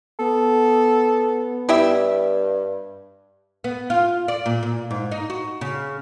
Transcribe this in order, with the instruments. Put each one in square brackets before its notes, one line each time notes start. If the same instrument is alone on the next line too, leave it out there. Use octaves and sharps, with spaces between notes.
[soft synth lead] B3 [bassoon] A4
[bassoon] G2 [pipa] E4 G4 E5
[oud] B3
F4
D5
A#2
A#2
G#2
D#4
F#4
C#3